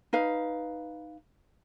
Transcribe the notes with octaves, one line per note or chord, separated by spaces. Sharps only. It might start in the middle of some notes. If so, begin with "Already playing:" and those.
D#4 B4 F5